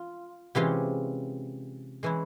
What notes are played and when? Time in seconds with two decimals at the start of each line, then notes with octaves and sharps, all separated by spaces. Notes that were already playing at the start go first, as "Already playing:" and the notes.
Already playing: F4
0.55 C3 E3 G#3 C#4 F4 G4
2.03 E3 G#3 C#4 E4